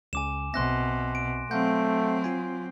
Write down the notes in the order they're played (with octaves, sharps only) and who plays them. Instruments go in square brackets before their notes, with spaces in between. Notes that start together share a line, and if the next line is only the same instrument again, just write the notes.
[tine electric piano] C#2 C#3 [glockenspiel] G#5 D6 E7
[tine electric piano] B1 C4 E5 [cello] B2 [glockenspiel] C6 F#6 A#6
[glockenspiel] D7
[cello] F#3 C4 [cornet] A3 [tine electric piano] F5 F#5 [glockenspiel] G6
[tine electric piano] F4 G#5